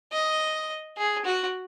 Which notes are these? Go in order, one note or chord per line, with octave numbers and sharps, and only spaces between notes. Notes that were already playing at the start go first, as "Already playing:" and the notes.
D#5
G#4
F#4